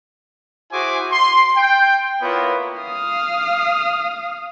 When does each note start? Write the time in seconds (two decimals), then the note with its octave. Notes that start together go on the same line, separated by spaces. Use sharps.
0.72 E4 F#4 G#4 C5 G#5 D6
1.11 C6
1.56 G5
2.21 A#3 B3 E4 F4 C#5 F#5
2.81 F5 D#6